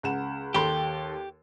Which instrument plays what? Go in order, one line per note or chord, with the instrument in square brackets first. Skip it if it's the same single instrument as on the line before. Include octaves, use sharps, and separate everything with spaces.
[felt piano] C#2 F#5 E7
[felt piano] D#2 A4 C6 [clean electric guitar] G4